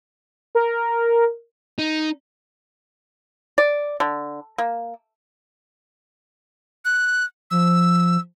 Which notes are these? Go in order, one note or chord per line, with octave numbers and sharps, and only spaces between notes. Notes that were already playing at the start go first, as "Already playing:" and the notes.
A#4
D#4
D5
D3
A#3
F#6
F3 E6